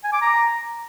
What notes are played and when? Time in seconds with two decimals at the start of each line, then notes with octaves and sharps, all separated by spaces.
0.04 G#5
0.13 D6
0.22 A#5